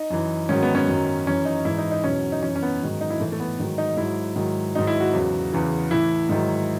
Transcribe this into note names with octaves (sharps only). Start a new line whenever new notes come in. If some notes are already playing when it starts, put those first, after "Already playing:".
Already playing: D#4
F#2 E3
G#2 D#3 F#3 C#4
B3
C#4
F#2 D#3 F#3
F#2 E3 C#4
D#4
G#2 E3 E4
D#4
D#4
E2 B2 F#3 C#4
D#4
F#2 E3 C#4
C#4
B3
G#2 D#3 F#3
D#4
E4
A2 E3 A3
A3
B3
G#2 D#3 F#3
D#4
G#2 F#3 E4
G#2 D#3 F#3
G#2 D#3 F#3 D#4
E4
F#4
E2 C#3 F#3
E2 C#3 E3
A2 E3 E4
G#2 D#3 F#3